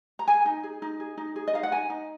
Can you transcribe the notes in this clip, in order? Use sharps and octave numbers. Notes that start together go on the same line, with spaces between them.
A#5
G#4 G#5
D#4
G#4
D#4
G#4
D#4
G#4
D#5
D#4 F5
F#5
D#4 G#5
D#4